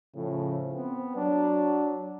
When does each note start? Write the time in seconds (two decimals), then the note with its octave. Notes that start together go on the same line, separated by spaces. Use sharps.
0.15 A2 C#3 F3
0.73 B3 C4
1.16 F#3 D4